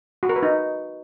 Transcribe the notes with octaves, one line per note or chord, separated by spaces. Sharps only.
F#4
A#4
B4
D#4